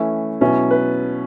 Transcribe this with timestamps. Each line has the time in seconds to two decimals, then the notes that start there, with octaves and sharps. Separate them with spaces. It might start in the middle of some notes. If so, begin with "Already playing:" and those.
Already playing: E3 A3 C#4 E4
0.41 B2 F#3 C#4 E4
0.71 B4